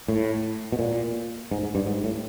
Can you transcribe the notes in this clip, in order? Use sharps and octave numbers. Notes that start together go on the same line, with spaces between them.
A2
B2
A#2
G#2
G#2
G2
G#2
A2